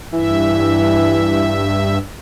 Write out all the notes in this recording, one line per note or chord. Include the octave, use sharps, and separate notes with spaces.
G2 E3 E5